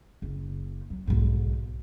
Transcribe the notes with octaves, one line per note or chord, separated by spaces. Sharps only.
F#1
F#3
B1 G#2